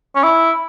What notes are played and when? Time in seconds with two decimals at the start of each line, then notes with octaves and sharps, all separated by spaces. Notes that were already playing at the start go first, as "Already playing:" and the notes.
0.16 C#4
0.24 E4